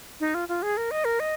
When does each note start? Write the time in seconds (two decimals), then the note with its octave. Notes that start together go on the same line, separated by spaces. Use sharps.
0.20 D#4
0.34 F4
0.49 F4
0.63 G#4
0.77 A#4
0.91 D#5
1.05 A#4
1.20 D#5